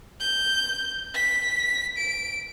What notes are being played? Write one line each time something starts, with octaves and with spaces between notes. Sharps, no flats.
G6
B6
D7